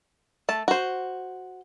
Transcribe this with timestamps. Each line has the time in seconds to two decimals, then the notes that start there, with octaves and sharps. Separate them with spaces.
0.49 A3 A5
0.68 F#4 C5